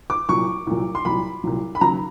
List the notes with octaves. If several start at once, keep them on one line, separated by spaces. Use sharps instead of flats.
D6
C2 A#2 F#3 C#6
C2 A#2 F#3
C6
C2 A#2 F#3 B5
C2 A#2 F#3
B5
D#2 C#3 F#3 A#5